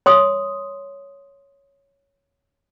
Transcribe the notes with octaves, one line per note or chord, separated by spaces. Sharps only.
C#5 C6 D#6